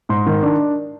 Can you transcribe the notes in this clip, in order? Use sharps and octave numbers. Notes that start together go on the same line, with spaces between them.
G#2 C6
D#3
D4